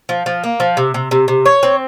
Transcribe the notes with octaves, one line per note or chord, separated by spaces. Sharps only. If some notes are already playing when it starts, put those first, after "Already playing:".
F3
F3
A#3
F3
C3
C3
C3
C3
C#5
C4